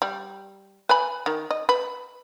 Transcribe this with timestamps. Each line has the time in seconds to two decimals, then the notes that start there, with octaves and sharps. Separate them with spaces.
0.02 G3
0.89 B4 G#5 B5
1.26 D#3
1.51 D#5
1.69 B4